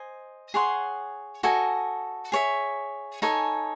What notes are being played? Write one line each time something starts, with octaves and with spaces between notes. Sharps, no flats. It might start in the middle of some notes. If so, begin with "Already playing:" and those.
Already playing: C5 D#5 G#5
G#4 C#5 F#5 C6
F#4 A4 D#5 G#5
G#4 C#5 E5
D#4 A4 C#5 G#5